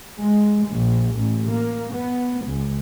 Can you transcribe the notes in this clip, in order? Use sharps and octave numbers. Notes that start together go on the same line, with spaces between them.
G#3
A#1
A1
A#3
B3
C#2